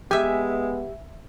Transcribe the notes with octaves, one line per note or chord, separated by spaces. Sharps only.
G#3 B3 G4 E5 G#5